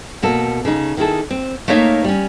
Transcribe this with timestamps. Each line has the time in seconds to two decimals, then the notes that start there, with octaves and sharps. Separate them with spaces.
0.22 B2 A#3 A4
0.65 C#3 D#4
0.97 D#3 E4 G#4 A4
1.31 C4
1.68 A3 A#3 D#4 C#5 E5 F5
2.04 G3 C#4